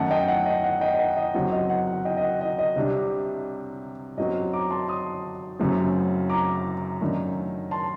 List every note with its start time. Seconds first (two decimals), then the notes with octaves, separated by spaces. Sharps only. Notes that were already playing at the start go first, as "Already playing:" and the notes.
Already playing: F#2 D#3 A3 F#5 A5
0.10 D#5 G5
0.28 F#5
0.46 D#5
0.64 F#5
0.81 D#5 G5
0.94 D#5
0.99 F#5
1.17 D#5
1.34 F#1 F#2 F#3 C4 F#5
1.53 D#5
1.70 F#5
1.87 F#5
2.05 D#5 G5
2.17 D#5
2.23 F#5
2.41 D#5
2.59 D#5
2.76 C2 C3 G3 D4
4.17 F#2 F#3 C4 D#5
4.53 A#5 D6
4.70 A5 C6
4.88 C6 D#6
5.59 F#1 F#2 F#3 A3 C4
6.30 A#5 D6
7.01 F#2 D#3 A3 D4
7.71 A5 C6